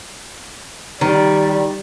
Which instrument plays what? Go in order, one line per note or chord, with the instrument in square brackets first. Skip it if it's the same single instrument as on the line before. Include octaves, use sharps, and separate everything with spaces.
[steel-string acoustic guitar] D#3 [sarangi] G3